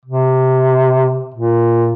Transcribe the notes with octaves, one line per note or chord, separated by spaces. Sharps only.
C3
A#2